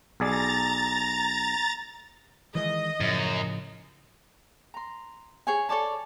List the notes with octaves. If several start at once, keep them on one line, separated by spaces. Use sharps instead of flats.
B1 G#4 D5 A#5 A6
D#3 E3 G#3 D#5
F#2 A2 C#3 F3
A#5 C6
G#4 C#5 G#5
A4 C#5 D5 A5